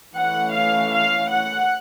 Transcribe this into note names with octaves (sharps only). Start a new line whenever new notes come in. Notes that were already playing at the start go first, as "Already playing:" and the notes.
E3 A3 C#4 F#5
F5
F5
F#5